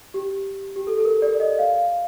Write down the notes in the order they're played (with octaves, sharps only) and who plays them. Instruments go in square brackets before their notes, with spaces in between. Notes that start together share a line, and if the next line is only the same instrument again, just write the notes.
[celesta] G4
G4
A4
A4
A#4
D5
D#5
F5